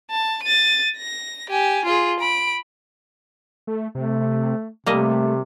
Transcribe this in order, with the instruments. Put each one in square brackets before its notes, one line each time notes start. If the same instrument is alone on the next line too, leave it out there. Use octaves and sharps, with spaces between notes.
[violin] A5
A6 D#7
A#6
G4 G#5
F4 G#4
B5 D7
[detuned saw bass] A3
[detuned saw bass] C3 [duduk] A3
[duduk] C3 [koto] G3 A#3 D#5 [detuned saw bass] A3